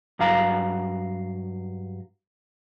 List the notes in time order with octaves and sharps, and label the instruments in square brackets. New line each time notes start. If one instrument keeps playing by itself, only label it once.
[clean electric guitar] G2 F#3 F5 A#5